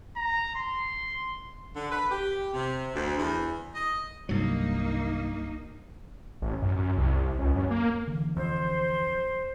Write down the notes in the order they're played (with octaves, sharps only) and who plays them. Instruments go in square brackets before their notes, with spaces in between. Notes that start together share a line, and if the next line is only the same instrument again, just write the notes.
[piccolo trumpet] A#5
C6
[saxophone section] D3
B4
G4
C3
D2
E2
D#5
[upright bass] C2 [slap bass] G2 F#3 [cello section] A#3 D#4
[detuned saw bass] A1
F#2
F#2
C2
C#2
F#2
A#3
[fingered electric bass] D3 E3
[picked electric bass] F2 [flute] C5